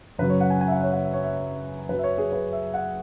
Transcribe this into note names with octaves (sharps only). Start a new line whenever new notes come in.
F#2 C#3 F#3 B4
C#5
F#5
G#5
G#5
E5
F#5
C#5
F#5
E5
C#5
E5
F#2 F#3 B4
E5
C#5
G#4
B4
E5
F#5